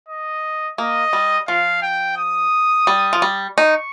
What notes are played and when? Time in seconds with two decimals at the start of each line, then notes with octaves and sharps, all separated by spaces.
0.08 D#5
0.78 A#3 D#5
1.13 G3
1.48 F3 F5
1.82 G5
2.17 D#6
2.87 G3
3.13 F3
3.22 G3
3.58 D#4 C#6